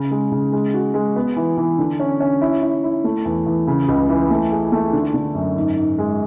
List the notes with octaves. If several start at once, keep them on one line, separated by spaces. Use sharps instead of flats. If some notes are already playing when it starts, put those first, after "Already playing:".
Already playing: C#3
G#3
C#3
G#3
F#4
G#3
B3
E3
E3
D3
C#4
C#4
E4
E4
E4
A3
E2
E2
C#3
C#2
E3
A3
G#4
A3
D3
D3
F#2
G#2
G#2
G#3